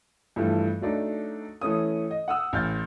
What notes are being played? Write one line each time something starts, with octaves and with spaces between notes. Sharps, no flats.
G2 E3 F3 G3 A3
F#3 A3 D4 D#4
E3 A3 C#4 D#6
D#5
F#5 D#6 E6
A1 F6 G6 A6